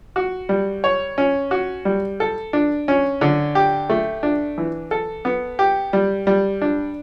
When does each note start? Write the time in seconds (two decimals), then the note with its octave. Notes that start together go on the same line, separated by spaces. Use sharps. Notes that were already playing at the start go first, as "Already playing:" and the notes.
0.16 F#4
0.49 G3
0.84 C#5
1.18 C#4
1.51 F#4
1.85 G3
2.20 A4
2.53 D4
2.88 C#4
3.21 D3
3.55 G4
3.90 A3
4.23 D4
4.58 E3
4.91 A4
5.25 B3
5.59 G4
5.93 G3
6.27 G3
6.62 D4